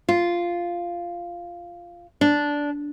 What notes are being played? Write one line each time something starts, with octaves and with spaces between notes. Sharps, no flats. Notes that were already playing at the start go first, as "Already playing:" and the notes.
F4
D4